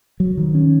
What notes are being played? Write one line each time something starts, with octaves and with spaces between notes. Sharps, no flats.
F#3
D#3
C#4